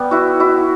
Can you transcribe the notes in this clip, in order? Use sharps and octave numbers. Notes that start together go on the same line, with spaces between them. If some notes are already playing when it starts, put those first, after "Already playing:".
Already playing: G3 B3
E4 F#4
E4 F#4